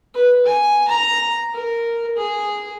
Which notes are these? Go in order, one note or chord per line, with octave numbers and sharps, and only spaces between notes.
B4
G#5
A#5
A#4
G#4